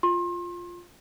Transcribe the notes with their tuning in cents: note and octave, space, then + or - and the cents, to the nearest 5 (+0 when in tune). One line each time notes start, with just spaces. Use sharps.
F4 +0 C6 +35